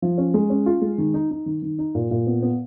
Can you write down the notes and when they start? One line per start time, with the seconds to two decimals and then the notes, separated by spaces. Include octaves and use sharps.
0.02 F3
0.18 C#4
0.34 G#3
0.50 C#4
0.66 F4
0.82 G#3
0.98 D#3
1.14 D#4
1.31 D#4
1.46 D#3
1.62 D#3
1.79 D#4
1.95 A#2
2.11 A#2
2.27 B3
2.42 B3